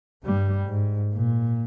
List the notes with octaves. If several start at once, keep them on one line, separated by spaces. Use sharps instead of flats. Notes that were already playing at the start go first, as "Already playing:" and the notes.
G2 G3
G#2
A#2